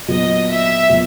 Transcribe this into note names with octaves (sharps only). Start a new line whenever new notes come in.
A#2 F#3 B3 D#5
E5
A#2 F#3 B3